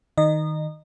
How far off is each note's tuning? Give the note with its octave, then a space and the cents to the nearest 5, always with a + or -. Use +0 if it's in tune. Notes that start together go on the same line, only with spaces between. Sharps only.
D#3 +0 D#5 -25